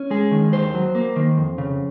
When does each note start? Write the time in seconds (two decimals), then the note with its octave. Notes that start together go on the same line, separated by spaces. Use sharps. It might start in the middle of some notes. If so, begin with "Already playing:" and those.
Already playing: C#4
0.10 G#3 G#4
0.31 D#3
0.52 D#2 C5
0.74 F#3
0.95 A#3
1.16 D#3
1.37 F2
1.58 C#3